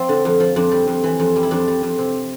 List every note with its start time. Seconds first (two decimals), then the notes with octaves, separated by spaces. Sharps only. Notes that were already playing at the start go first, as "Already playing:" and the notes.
Already playing: F3 C4
0.09 D3
0.25 F2
0.40 F3
0.56 F2 D4
0.72 G3
0.88 F2
1.04 E3
1.20 F2
1.36 G3
1.43 E4
1.51 F2 D4
1.68 G3
1.83 F2
1.98 C3